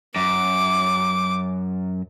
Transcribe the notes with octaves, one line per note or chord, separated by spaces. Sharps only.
F#2 D6